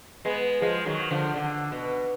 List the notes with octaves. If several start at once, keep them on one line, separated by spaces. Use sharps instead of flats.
G#3 B3
F3 G#3
D#3 F#3
D3 F3
D3
B2